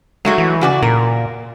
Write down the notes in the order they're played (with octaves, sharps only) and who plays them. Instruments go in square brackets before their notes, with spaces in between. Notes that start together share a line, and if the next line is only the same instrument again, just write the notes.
[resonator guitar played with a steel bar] F#3 A3 F#4 [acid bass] G#3
[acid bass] E3
[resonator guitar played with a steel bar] C#3 F#4 D5
[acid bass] A#2 [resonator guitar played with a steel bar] A#4